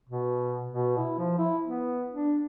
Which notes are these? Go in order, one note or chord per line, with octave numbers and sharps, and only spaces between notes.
B2
B2
E4
F3
E4
B3
D4